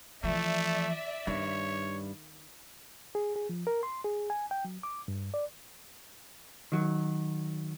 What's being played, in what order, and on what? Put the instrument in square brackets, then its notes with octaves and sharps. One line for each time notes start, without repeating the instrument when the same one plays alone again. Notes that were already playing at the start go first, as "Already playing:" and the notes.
[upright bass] E3 F3 [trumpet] A3 [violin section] D5 E5
[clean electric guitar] G2 [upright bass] D#3 D#4 [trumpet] C#5
[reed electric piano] G#4
G#4
F3
A#4
C6
G#4
G#5
G5
F#3
D6
G2
D5
[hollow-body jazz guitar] D#3 F#3